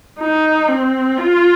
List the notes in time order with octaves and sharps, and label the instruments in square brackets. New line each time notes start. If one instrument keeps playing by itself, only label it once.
[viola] D#4
C4
F4